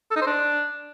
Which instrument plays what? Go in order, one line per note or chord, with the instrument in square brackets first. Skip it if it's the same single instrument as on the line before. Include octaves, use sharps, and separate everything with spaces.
[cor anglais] A4
D#4
C5
D4